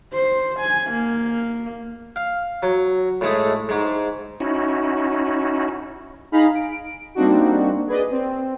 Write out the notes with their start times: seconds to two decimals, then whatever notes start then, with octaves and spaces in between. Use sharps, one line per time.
0.13 C5
0.60 G#5
0.91 A#3
2.16 F5
2.63 F#3
3.21 A2 G#3 A3 D#6
3.69 G#2 G#3
4.40 C#4 D#4 E4 F#4
6.32 D#4 G#4 F5 A#5 B5
6.55 D7
7.15 G3 A#3 C4 D4 D#4 F#4
7.87 G#4 B4 D5 D#5
8.10 C4